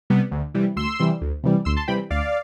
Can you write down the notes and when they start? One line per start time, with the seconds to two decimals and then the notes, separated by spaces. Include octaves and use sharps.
0.10 C3 G3 B3
0.32 D2
0.54 C3 E3 G3
0.76 D2 C6 E6
1.00 C3 E3 G3
1.21 D2
1.43 C3 E3 G3
1.65 D2 C6 E6
1.77 A5 C6
1.88 C3 E3 G3 G5 B5
2.10 D2 D5 F5